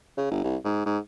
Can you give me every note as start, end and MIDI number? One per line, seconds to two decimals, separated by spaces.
0.18 0.28 49
0.31 0.40 31
0.44 0.56 36
0.65 0.85 44
0.86 0.98 44